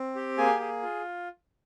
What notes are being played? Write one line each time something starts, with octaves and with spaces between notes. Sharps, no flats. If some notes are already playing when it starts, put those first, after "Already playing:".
Already playing: C4
G4
A#3 G#4 G#5
G#4
F4